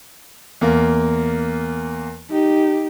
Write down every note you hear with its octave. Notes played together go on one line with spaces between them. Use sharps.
E2 A#3
D#4 G4